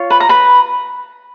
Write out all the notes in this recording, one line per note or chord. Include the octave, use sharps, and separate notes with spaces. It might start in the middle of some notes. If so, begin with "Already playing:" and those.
Already playing: F4 C#5
B4 B5
A#5
B4 B5